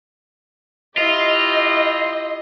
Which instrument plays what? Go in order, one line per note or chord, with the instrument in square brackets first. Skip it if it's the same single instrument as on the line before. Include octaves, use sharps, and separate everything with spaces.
[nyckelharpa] E4 G4 [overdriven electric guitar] F4 [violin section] D#5